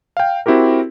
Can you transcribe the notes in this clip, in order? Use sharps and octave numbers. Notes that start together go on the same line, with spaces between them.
F5 G5
C4 E4 F#4 G4 A#4